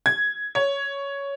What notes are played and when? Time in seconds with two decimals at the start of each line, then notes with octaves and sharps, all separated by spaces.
0.06 G#6
0.55 C#5